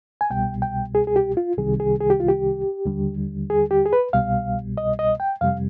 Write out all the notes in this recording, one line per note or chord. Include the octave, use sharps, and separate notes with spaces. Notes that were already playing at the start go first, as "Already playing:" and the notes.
G#5
C2 B2 G3 G5
G5
G#4
G#4
G4
F4
C2 C3 D#3 G3 G#4
G#4
G#4
G4
F4
G4
D#2 D3 G3
G#4
G4
G#4
B4
C2 B2 G3 F5
D#5
D#5
G5
F2 C3 G3 F5